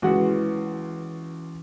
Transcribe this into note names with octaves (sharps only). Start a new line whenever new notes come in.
C#2 E3 C#4 E4 F#4 F#5